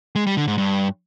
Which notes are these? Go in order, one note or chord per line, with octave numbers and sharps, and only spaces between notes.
G#3
G3
D3
G#2
G2